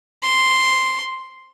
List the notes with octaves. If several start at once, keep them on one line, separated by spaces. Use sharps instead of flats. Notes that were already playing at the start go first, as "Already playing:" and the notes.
C6